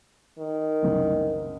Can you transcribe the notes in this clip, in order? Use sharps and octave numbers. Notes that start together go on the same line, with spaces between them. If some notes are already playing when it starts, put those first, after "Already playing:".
D#3
F#1 C2